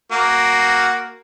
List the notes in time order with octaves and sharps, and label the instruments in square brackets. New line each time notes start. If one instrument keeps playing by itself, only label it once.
[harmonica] A#3 F#4